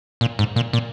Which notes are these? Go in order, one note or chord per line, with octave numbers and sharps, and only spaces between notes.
A#2
G#2
A#2
A#2